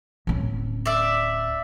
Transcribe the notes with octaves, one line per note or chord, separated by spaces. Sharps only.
D1 C#4
D5 E5